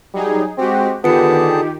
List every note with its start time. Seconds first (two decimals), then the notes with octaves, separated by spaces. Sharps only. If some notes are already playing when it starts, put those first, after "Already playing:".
0.14 F#3 G3 D#4 G#4
0.58 G#3 C4 F#4 G4
1.04 D3 D#3 B3 F4 G4 G#4 A5 C#7